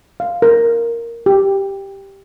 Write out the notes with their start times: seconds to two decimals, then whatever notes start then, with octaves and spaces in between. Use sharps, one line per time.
0.20 F5
0.42 A#4
1.26 G4